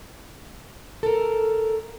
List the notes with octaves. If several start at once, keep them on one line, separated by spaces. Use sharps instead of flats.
A4 A#4